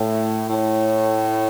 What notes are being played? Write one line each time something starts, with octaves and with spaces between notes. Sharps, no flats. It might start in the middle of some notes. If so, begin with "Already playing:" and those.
Already playing: A2
A2